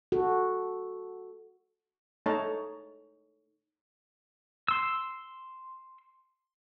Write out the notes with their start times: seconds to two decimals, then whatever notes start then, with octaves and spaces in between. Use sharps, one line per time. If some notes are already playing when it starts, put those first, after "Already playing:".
0.12 F#4 A4
2.26 A3 D#4 C#5 A5 A#5
4.68 C6 E6